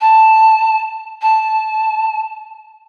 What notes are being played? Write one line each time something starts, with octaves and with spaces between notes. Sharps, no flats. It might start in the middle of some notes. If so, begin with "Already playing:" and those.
A5
A5